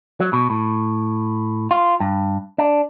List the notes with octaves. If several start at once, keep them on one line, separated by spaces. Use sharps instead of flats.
F#3
B2
A2
F4
G2
D4